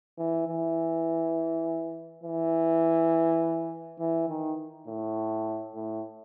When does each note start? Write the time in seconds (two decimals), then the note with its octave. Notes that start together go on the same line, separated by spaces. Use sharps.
0.18 E3
0.48 E3
2.23 E3
3.99 E3
4.29 D#3
4.87 A2
5.75 A2